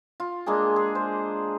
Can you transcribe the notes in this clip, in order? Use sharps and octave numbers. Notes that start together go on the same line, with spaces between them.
F4
G#3 A#3 D4 G#4
G#4
C5